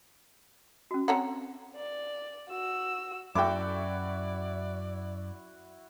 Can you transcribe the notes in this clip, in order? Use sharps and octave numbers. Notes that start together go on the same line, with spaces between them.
C#4 F#4
C4 C#5 F#5 A#5
D5
F#4 E6
F#2 E4 F#4 A4 D5 G5 D6